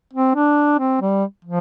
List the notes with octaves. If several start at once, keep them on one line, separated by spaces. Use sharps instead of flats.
C4
D4
C4
G3
F3